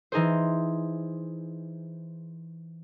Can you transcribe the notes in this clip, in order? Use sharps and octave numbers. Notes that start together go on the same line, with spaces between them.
E3 D#4 G#4 C5